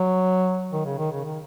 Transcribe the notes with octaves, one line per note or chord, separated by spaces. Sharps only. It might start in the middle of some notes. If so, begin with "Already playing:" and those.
Already playing: F#3
D#3
C#3
D#3
C#3
D#3